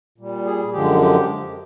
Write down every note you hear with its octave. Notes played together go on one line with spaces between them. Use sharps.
A#2 G3
G#4
F#2 D3 F3 G#3 G4
G4